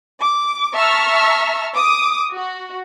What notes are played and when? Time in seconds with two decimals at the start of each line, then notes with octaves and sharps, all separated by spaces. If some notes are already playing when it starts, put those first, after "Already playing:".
0.20 D6
0.75 E5 A5 A#5 C#6 E6 F6
1.74 D6 D#6
2.33 F#4